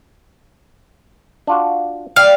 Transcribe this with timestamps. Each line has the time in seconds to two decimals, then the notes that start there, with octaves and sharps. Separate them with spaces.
1.47 D4 F4 F#4
2.16 G3 F5